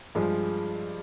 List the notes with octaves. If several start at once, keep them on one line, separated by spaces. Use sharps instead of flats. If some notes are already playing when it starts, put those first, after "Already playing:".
G2 F3 G#3